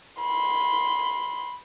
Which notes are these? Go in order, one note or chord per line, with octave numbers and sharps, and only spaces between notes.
B5 C6